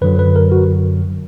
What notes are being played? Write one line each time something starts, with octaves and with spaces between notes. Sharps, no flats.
F#2 D3 F#3 B4
B4
A#4
F#4